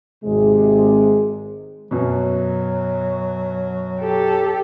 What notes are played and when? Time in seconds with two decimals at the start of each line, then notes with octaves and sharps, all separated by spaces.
0.24 G#1 C3 G#3
1.91 F#2 B2 F#3
3.99 G4 A4